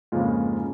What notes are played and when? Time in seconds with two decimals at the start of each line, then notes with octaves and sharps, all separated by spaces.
0.12 F2 G#2 C#3 G#3 A#3 F4
0.59 C#3 C#4